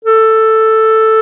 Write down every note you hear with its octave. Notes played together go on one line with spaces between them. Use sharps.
A4